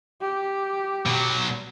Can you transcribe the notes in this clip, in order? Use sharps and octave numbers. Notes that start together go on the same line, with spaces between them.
G4
B2 F#3